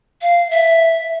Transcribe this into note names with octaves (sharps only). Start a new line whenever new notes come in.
F5
E5